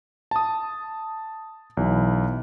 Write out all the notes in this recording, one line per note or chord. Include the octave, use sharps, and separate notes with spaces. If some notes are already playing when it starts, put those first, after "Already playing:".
A5 D#6
B1 E3